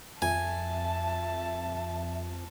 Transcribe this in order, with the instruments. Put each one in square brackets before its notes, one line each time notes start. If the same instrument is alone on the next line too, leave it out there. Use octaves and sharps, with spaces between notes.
[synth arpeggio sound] F2 [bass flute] E5 [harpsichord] G#5 [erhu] A5